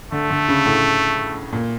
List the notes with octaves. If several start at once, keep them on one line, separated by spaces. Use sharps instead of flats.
D3 A3
D3
C#3
A2
A#2